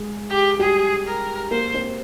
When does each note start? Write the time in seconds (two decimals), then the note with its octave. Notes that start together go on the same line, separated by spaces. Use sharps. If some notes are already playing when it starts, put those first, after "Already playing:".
Already playing: G#3 G#4
0.30 G4
0.59 G3 G4 G#4
1.06 A#4
1.51 A#3 A#4 C5
1.74 C4 C5